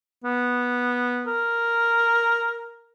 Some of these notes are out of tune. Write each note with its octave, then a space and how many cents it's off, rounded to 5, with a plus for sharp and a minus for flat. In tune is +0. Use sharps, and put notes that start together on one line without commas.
B3 -10
A#4 +0